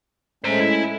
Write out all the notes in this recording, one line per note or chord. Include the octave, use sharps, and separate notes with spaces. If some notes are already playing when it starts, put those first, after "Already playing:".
G#3 A3 C#4 C5 A#5
E4